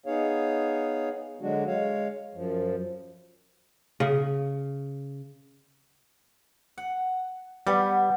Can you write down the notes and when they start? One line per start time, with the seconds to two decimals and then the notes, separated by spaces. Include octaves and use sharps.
0.06 B3 D#4 G#4 C#5 F5
1.41 D3 F#3 G#3 D4 F#4
1.67 G#3 C#5 F5
2.35 F#2 F3
4.00 C#3
6.78 F#5
7.67 G3 B3